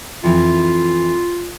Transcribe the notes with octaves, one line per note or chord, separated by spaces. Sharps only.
F2 E3 F4